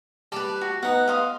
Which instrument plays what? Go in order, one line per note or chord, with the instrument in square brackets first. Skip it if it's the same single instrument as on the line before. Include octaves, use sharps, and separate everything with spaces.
[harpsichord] G3 D5 [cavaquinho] B4 A5
[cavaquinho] F#4
[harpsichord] B3 D#4 [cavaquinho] F#5
[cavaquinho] F5 C6 D#6